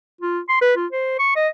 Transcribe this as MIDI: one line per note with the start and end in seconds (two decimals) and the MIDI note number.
0.21 0.40 65
0.49 0.57 84
0.62 0.73 71
0.76 0.87 65
0.92 1.16 72
1.19 1.33 85
1.36 1.48 75